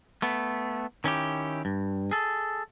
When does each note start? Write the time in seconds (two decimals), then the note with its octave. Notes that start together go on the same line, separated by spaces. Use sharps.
0.22 A3 B3
1.04 D#3 C#4 E4 G4
1.65 G2
2.11 G#4 A4